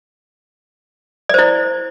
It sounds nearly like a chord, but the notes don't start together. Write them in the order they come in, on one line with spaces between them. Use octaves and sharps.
D5 C5 E4